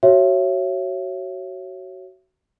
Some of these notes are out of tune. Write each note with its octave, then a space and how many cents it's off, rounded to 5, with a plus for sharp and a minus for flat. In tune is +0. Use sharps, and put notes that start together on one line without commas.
F#4 +25 C#5 -15 E5 +25